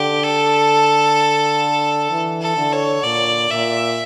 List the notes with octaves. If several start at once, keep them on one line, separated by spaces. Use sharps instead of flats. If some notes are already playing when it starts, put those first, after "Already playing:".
Already playing: D3 G4
A4
E3
A4
D3
C#5
A#2 D5
A#2 E5